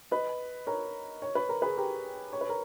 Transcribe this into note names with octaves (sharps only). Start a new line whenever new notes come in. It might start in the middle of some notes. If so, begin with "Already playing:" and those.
B4 D#5
A#4 C#5
C#5
B4
A#4
G#4 B4
G4 A#4
C#5
B4
A#4